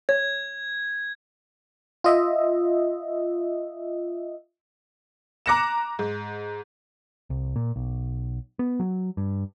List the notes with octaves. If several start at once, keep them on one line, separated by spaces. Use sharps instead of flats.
C#5 G#6
F4 D#5 E5
A#5 D6 F#6 A#6 C#7 E7
G#2
C2
A#2
B1
B3
F#3
G2